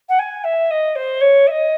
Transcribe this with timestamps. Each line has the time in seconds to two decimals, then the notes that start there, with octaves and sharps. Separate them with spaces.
0.08 F#5
0.18 G#5
0.43 E5
0.70 D#5
0.95 C5
1.20 C#5
1.47 E5
1.50 D#5